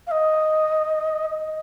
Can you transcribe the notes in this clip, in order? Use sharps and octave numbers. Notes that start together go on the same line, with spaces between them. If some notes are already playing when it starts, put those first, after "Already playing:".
F5
D#5
D#5